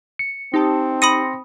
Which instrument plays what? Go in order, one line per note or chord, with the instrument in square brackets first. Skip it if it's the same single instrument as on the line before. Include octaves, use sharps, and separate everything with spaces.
[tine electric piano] C#7
[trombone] C4 [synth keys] D#4 G4 A5
[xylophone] B5 D#6 D#7 [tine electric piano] C6 A#6 C#7